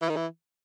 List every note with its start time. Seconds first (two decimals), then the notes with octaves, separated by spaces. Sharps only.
0.02 E3
0.09 D#3
0.16 E3